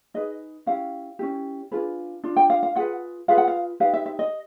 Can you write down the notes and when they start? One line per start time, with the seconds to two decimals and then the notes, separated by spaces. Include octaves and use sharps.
0.14 D#4 G#4 B4 D#5
0.66 C#4 E4 G4 F5
1.19 C#4 E4 G4
1.72 D4 F4 G#4 B4
2.24 D4 F4
2.37 G5
2.50 F5
2.63 F5
2.75 F4 G#4 B4 F#5
3.28 F4 G#4 B4 F5
3.38 F#5
3.48 F5
3.80 D#4 G4 B4 F5
3.94 E5
4.06 E5
4.19 D#5